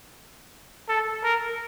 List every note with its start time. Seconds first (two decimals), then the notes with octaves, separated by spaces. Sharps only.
0.89 A4
1.24 A#4